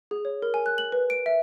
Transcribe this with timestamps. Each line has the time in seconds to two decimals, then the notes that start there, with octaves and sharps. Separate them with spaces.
0.11 G#4
0.25 C#5
0.42 A#4
0.54 G#5
0.66 F#6
0.78 F#7
0.92 B4
1.10 D7
1.26 E5